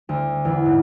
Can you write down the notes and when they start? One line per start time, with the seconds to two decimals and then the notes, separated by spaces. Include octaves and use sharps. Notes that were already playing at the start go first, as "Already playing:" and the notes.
0.09 D2
0.45 E2
0.65 G#2